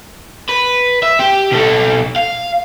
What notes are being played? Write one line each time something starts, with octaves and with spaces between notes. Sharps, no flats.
B4
E5
G4
B2 A4
F5